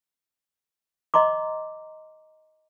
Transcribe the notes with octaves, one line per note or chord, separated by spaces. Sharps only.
D#5 A#5 C6 D6